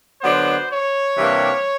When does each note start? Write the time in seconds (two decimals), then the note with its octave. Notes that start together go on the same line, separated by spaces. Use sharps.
0.22 D3 F#3 B3 D4 C5
0.70 C#5
1.17 C3 E3 G3 A#3 D4